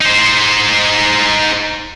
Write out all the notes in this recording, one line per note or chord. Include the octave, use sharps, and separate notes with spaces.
D#4 C5